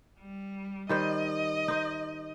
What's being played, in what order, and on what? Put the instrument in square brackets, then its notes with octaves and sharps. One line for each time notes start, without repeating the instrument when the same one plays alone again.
[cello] G3
[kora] D#3 G3 C5 [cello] D#5
[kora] D#4 C5